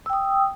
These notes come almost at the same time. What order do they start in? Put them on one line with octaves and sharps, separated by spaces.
E6 G5 D#6